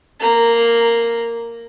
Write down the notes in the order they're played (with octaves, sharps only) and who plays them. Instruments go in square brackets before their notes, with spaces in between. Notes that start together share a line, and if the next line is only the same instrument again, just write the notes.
[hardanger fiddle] A#3 A#5